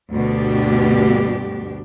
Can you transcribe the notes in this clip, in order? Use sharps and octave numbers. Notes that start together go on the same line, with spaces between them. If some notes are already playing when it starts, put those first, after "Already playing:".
D2 G2 B2 D4 G4